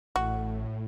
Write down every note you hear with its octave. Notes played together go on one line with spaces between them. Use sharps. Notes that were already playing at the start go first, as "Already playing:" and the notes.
A1 A2 F#4